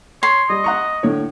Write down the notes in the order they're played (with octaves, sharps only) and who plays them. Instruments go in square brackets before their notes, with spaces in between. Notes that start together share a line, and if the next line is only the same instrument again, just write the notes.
[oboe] C#5 [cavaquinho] C6
[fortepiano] G3 [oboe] D#5
[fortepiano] F#5 A#5 C#6
A2 D3 C#5